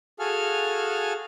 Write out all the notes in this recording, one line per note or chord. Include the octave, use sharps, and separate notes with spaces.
F#4 G#4 A4 F5 G#5 F6